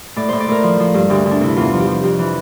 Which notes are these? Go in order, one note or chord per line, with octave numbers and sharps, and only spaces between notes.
A2 D5
A2 C5
D5
A2 A#4
F3
F3
G2
D2 G4
D2
D4
C3 E4
E2 F4
F3
G4
F3
F2 G4
E3